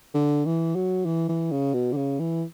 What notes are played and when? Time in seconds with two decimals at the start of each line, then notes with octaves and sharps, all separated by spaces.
0.14 D3
0.46 E3
0.76 F#3
1.06 E3
1.29 E3
1.52 C#3
1.74 B2
1.93 D3
1.97 C#3
2.20 E3